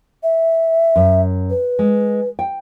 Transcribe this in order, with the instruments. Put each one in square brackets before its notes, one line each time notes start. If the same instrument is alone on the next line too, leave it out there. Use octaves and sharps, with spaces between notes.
[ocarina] E5
[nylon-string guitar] F#2
[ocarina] B4
[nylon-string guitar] G#3
G5